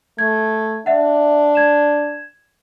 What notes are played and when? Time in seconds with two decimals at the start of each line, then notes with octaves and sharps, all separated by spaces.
0.18 A3 G#6
0.86 D4 E5 F#5
1.55 G#6 E7